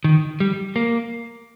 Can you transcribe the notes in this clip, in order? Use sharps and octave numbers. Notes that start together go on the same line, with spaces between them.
D#3
G3
A#3